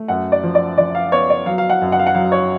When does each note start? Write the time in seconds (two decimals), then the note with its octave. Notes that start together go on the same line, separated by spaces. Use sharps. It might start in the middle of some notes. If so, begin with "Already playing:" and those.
Already playing: A3
0.08 F#2 F#5
0.32 D5
0.43 F3
0.55 D5
0.78 F3 D5
0.95 F5
1.12 B3 C#5
1.30 D5
1.46 F#3 F5
1.58 F5
1.70 F#5
1.81 F#2
1.92 F#5
1.99 F5
2.07 F#5
2.15 F#3 F5
2.32 C#5